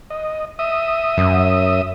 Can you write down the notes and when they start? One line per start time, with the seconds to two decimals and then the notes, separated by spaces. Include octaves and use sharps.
0.10 D#5
0.59 E5 D#6
1.17 F#2